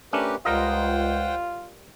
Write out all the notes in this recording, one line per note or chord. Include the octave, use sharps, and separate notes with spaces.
A3 C#4 D4 G4 A#4 B4
C#2 G3 F4 A#4 C5 D#5 F#5 G5